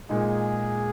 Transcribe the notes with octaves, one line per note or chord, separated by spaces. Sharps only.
A#2 G#3 D#4 G#4